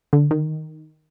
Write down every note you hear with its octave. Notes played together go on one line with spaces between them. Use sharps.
D3
D#3